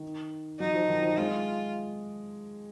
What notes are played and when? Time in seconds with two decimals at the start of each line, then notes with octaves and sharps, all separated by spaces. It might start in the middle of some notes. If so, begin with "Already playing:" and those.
Already playing: D#3
0.60 F#3 D#4
0.74 F3
0.88 D#3
1.02 F3
1.17 G#3 F4